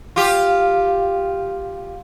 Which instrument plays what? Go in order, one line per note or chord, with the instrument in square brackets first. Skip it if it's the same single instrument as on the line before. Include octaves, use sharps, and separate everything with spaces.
[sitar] F4 G4